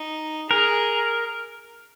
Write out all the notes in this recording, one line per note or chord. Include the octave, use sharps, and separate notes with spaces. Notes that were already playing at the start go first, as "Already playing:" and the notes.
Already playing: D#4
G#4 A#4